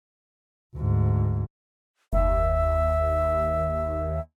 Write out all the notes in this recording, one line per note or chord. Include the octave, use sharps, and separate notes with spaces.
D2 G#2
F#1 D#2 E5